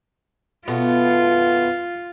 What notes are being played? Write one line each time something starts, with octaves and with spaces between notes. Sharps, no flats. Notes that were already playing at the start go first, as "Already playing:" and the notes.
B2 A3 B3 F4